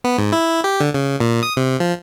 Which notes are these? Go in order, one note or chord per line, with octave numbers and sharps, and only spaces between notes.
B3
G#2
E4
G4
D3
C#3
A#2
D#6
C3
F3